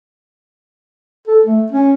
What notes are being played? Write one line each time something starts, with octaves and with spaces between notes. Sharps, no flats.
A4
A3
C#4